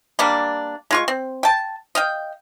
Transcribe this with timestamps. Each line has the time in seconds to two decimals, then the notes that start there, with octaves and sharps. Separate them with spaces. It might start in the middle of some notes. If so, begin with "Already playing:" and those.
0.19 G3 A#3 D4
0.91 G#3 F4 C#6
1.08 C4
1.43 G5 A5
1.95 D#5 F5 G5